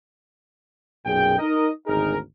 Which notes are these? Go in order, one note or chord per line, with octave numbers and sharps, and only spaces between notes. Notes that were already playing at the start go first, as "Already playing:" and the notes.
B1 F#2 A#2 G#4 G5
D#4 A#4 D#5
G#1 D2 D#4 G#4 A#4